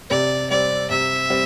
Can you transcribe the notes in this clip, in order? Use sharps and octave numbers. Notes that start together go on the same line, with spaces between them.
C3 D5
G3 C4 D5
C3 E5
G3 C4